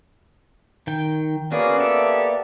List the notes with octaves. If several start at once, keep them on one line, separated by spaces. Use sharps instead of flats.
D#3 G5
A#3 B3 C#4 F#4 G#4 D5
G4 A4 E5